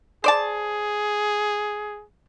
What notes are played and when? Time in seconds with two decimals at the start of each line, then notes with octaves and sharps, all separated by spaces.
0.24 G#4 C5 D5 A5